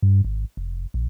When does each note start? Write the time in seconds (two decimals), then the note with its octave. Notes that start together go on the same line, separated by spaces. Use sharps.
0.02 G2
0.24 G#1
0.57 F1
0.94 A#1